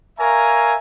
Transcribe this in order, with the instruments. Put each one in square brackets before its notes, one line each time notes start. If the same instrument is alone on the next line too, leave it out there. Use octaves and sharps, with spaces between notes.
[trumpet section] A#4 C#5 E5 F5 G#5 A#5